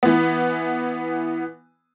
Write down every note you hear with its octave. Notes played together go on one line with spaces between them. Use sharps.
E3 B3